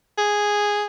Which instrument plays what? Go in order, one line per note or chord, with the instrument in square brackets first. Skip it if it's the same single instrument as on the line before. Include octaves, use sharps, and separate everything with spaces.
[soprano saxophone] G#4